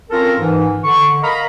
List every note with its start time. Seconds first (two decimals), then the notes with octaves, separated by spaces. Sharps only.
0.10 C4 C#4 F4 A4 A#4
0.38 G#2 E3
0.83 D3 C#6
1.22 A#4 D#5 F5 A#5 B5